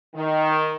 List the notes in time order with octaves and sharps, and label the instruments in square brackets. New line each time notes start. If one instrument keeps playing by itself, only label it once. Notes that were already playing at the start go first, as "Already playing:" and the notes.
[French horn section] D#3